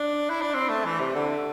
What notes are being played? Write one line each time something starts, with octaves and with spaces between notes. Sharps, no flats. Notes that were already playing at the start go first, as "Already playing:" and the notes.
Already playing: D4
E4
D4
C4
A3
E3
C3
D3